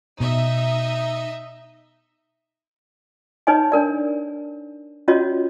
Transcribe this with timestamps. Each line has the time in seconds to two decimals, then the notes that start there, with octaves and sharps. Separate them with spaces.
0.20 B2 D#4 D#5 E5
3.47 D#4 B4 C#5 D#5 G#5
3.72 D4 A#4 D5
5.08 C#4 F4 F#4 C#5 D#5